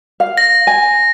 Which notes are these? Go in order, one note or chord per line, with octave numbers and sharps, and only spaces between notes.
F5
A#6
G#5